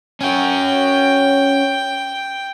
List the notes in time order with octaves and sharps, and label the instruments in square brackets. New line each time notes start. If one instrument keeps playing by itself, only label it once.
[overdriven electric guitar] C#4 F#4 [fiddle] G5